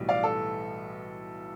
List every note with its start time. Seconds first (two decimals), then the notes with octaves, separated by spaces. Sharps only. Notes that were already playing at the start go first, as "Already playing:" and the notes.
Already playing: B1 A2 E3 G3
0.09 D5 F5
0.23 A4